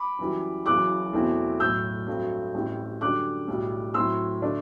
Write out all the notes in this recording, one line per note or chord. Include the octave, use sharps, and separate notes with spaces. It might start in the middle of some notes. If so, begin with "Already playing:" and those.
Already playing: B5 D6
F#2 E3 G3
F#1 F#2 E3 D6 F#6
E2 B2 A3 C4 E4
B1 A2 F#3 E6 G6
G2 F#3 A3 C4
A1 A2 G3 C4 E4
F#2 D3 G3 D4 D6 F#6
B1 A2 G3
A2 F#3 C4 E4 C6 E6
D3 A3 D4